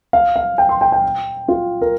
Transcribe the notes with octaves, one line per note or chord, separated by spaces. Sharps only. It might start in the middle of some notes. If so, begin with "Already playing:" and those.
F5
F5
G5
C6
G5
G5
F4
A#4